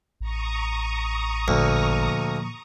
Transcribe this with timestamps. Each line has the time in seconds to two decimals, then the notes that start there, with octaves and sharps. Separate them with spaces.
0.20 A1 A#5 C#6 D#6
1.48 D2 A#2 F3